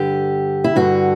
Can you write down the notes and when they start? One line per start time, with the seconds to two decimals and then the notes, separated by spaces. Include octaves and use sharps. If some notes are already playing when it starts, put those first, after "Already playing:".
Already playing: G2 D3 G4
0.64 E4
0.76 G2 D3 F#4